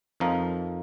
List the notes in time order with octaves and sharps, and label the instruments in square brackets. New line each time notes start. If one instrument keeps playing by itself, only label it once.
[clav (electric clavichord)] F2 F3 D#4 A#4